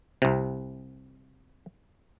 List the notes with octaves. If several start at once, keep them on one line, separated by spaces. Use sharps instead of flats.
C2 C3